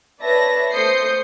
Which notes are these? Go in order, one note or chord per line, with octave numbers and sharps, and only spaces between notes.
B4 C#5 D5 E5 A5 A#6
A3 C5 D#6 G6 C7 C#7